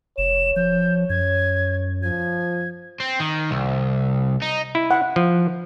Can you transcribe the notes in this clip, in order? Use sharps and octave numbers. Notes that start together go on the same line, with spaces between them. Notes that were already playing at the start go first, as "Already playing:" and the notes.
F1 C#5 E7
F3 G6
F#2 G#6
F3 G#6
C4
D#3
C2
D#4
E4
F#5
F3